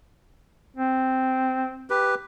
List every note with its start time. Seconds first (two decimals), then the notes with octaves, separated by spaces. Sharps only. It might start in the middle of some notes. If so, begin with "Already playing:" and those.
0.76 C4
1.90 G4 B4